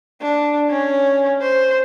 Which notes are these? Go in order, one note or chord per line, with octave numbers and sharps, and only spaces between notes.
D4
C#4
C5